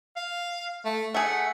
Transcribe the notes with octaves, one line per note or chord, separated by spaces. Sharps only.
F5
A3
A3 G#4 F#5